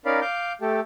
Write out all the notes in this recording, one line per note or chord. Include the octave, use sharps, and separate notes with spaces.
C#4 D#4 A#4 D5 F5 B5
F5 D6 G6
A3 G4 A4